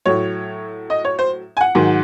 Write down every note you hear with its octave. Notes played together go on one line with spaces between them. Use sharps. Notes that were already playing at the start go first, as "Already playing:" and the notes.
A2 F#3 C#5
D#5
C#5
C5
G#5
F#5
G#2 D#3 F#3